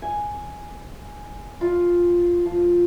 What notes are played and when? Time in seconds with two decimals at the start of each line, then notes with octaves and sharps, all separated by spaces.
0.02 G#5
1.61 F4
2.46 F3